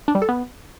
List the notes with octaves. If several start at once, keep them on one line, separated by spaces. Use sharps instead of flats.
D4
G3
A4
B3